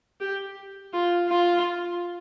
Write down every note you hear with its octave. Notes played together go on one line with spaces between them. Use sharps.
G4
F4
F4